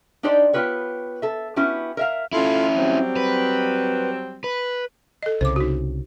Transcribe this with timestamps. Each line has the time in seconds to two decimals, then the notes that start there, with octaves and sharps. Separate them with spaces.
0.23 D4 D#4 G4 C5 D5
0.53 B3 F4 G4 B4 C#5
1.22 A4 E5
1.56 B3 C#4 E4 F#4 G4
1.97 A#4 E5 F5
2.33 C#4 E4 F4 A4
2.77 F#3 G3 C4
3.16 B4
4.44 B4
5.23 A4 D#5
5.41 C2 C#3 C5 D6
5.56 D#4 F#4